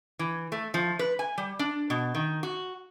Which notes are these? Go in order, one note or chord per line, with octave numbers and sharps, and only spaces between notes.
E3
A3
F3
B4
G#5
G3
D4
B2
D#3
F#4